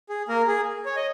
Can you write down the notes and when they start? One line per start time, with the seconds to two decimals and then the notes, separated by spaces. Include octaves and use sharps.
0.09 G#4
0.28 A#3 A#4
0.48 G#4
0.86 C#5
0.96 D#5